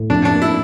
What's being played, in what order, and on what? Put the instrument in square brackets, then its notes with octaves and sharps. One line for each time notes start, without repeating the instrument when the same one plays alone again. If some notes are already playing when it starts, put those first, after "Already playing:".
Already playing: [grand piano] A2
[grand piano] F2 [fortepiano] D4
[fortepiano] D4
[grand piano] A#3
[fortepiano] E4